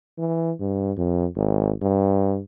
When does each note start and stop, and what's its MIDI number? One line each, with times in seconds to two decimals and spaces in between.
0.18 0.52 52
0.60 0.92 43
0.97 1.26 41
1.35 1.72 32
1.82 2.40 43